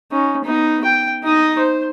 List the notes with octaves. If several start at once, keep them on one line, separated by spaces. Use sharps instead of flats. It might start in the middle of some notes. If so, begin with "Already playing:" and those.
C#4 D#4
B3 D#4
G5
D#4 D#5
C5